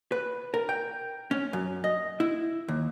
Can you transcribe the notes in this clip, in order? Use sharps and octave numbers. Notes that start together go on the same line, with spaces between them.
B4
A#4
G5
C#4
F#2
D#5
E4
D#2